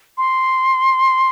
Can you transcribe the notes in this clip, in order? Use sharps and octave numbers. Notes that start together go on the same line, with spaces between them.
C6